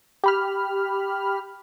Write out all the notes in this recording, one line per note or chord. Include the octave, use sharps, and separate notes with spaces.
G4 B5 F6